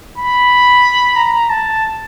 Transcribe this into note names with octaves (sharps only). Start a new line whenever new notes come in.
B5
A#5
A5